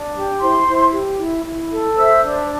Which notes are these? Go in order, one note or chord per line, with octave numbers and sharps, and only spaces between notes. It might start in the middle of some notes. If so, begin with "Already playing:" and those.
Already playing: D4
G4
E4 C5 C6
E4
G4
E4
E4
A4
C5 E5 E6
D4